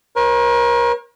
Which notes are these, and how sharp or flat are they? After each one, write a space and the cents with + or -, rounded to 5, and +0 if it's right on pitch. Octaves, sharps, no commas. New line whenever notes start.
A#4 +35 C#5 -45